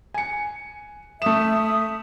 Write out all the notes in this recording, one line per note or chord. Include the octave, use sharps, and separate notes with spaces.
G#5 C#7
A3 E5 D#6 E7